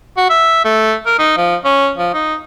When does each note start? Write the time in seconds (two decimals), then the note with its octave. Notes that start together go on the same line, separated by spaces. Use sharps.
0.17 F#4
0.30 E5
0.65 A3
1.06 A#4
1.19 D#4
1.37 F3
1.65 C#4
1.98 F3
2.14 D#4